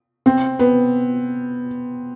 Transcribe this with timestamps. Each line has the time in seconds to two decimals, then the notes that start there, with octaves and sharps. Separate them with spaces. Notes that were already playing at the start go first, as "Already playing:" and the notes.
0.26 C4
0.59 B3